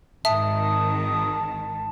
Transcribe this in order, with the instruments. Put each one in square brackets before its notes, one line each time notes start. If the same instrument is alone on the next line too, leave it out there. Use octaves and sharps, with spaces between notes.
[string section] G#1 D#3 [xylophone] E5 [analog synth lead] A5 [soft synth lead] D#6